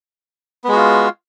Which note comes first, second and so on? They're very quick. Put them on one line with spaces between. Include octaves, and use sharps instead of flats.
B3 G#3 F#4 F4